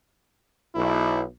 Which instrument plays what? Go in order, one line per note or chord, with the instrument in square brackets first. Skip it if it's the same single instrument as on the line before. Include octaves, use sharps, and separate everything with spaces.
[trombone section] B1 [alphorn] E4